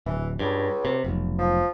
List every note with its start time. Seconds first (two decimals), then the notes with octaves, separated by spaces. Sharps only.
0.06 D1 E3
0.39 C#2 G2
0.85 C3
1.04 F1 B1
1.38 F3